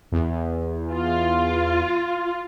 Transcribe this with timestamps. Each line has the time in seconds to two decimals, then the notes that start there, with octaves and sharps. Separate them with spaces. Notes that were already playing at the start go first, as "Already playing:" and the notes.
0.12 E2
0.92 F4